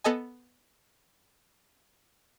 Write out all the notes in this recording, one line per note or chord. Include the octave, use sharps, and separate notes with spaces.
B3 A4 D#5 G#5